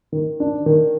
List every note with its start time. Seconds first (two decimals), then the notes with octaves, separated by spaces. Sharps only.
0.12 D#3
0.40 D4
0.66 D#3